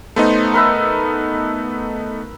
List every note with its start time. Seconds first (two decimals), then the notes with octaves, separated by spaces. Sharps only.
0.16 A3 B3 D#4 C5
0.54 A#4 B4 E5